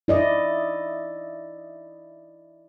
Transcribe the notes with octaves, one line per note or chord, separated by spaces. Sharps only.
E4 D5 D#5